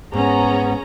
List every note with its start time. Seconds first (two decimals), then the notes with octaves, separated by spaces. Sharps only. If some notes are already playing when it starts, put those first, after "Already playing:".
0.14 G#2 B3 C#4 G#4 A#5